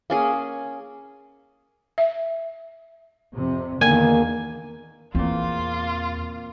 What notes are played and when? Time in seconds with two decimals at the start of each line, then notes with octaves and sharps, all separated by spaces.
0.10 A#3 C#4 G#4
1.98 E5
3.35 F2 C3
3.81 E2 D3 D#3 A#3 G#5
5.15 E2 A#2 C4 F4